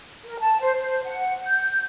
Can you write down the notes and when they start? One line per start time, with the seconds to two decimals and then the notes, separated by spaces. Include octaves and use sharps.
0.24 A#4
0.39 A5
0.60 C5
0.80 C5
1.05 F#5
1.47 G6